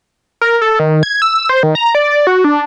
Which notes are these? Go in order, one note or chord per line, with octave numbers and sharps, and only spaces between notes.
A#4
A4
D#3
G#6
E6
C5
D#3
A#5
D5
F#4
D4